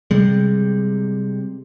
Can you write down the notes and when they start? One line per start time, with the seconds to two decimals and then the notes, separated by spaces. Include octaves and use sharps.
0.11 C3 G3 G#3